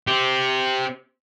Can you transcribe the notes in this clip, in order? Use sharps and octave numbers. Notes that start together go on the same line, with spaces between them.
C4 G4